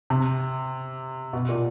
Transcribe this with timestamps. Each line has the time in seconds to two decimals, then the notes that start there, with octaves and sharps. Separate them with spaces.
0.10 C3
1.33 B2
1.49 A#2